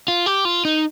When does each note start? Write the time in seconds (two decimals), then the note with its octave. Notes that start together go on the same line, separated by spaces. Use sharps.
0.08 F4
0.26 G4
0.45 F4
0.65 D#4